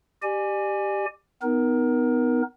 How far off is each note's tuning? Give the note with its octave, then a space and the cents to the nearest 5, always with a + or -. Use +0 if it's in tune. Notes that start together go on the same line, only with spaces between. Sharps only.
G4 +0 D5 +40 G#5 +0
B3 +20 D#4 +0 A#4 +25